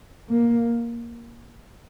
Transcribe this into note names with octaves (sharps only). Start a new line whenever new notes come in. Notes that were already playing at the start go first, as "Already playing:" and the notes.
A#3